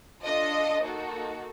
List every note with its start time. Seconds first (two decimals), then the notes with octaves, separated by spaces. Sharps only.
0.24 D4 F4 A4 D#5
0.83 A#3 D#4 F#4 A4